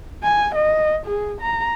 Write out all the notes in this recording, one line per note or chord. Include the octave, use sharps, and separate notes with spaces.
G#5
D#5
G#4
A#5